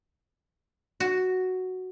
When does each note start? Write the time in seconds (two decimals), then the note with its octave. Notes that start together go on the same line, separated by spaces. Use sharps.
1.00 F#4